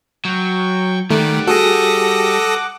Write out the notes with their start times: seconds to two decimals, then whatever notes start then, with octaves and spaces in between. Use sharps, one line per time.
0.25 F#3 G5 C#6
1.11 D#3 G3 A3 F#5 D6
1.47 F#4 G#4 A4 D#6 A#6